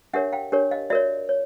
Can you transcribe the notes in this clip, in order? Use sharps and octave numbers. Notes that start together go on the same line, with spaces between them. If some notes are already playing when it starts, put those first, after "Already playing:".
D4 G4 A#4 C#5 E5 F#5
F5 G5
D4 G4 A#4 C#5
D#5 F5
F#4 A#4 C#5 D5 E5
C#5